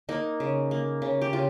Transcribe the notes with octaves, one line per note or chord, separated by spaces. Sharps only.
A#3 D#4
C#3
A#3
C#3
G4
C#3 F4